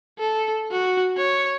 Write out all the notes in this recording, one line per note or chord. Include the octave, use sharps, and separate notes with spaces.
A4
F#4
C#5